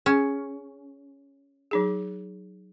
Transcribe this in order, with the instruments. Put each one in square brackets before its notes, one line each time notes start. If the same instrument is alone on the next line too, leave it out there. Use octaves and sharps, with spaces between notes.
[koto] C#4 [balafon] G#4
[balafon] F#3 D#4 G#4